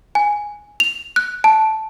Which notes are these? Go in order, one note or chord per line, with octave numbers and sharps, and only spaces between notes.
G#5
F7
F#6
A5